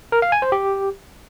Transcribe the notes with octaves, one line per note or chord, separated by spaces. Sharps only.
A#4
F5
G#5
C5
G4